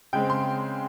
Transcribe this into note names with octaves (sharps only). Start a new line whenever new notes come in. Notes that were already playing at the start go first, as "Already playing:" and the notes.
C#3 G#3 C4 G5
C6